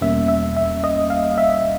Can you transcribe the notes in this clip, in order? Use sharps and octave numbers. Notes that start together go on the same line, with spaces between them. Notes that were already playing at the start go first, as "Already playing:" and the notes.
E2 B2 G3 A#3 C#4 E5
E5
E5
D#5
F5
E5